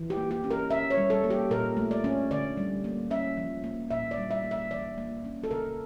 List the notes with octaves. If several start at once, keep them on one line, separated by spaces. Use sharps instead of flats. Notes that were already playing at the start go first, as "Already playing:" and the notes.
Already playing: E3
G4
A#3
G4
C#4
A#4
C#4 E5
C#5
G3
A4
A#3
G4
A#2 A#4
A3
D5
C#4
D3 D5
G3
A#3
C#4 E5
F3
A#3
A#2 E5
D5
G3
E5
A#3
E5
E3 D5
A#3
C#4
A4
C#3 A#4